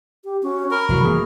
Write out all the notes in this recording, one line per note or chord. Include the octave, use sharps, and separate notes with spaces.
G4
C#4 F#4
A#4 B5
F1 E3 F#3 F#4
E3 F3 A#3 G#4